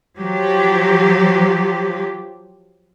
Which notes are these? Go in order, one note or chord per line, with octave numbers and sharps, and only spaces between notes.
F3 F#3 G4